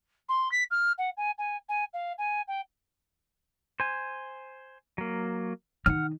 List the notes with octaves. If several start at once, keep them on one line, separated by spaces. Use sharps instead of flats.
C6
B6
F6
F#5
G#5
G#5
G#5
F5
G#5
G5
C5 G#5
F#3 A#3
D#3 F#5 F6